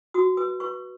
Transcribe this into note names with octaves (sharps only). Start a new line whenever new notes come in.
F#4 D#6
B4 D#6
B4 C#6